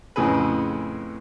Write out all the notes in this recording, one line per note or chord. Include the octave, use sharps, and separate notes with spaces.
F2 A2 C#3 G#4 B4